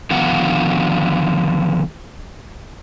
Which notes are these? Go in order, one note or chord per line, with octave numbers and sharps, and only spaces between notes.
D3 D#3 F3 B3 F5 F#5